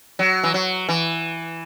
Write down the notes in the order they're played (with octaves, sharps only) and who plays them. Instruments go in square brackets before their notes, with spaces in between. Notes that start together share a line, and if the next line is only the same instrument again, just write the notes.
[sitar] F#3
E3
F#3
E3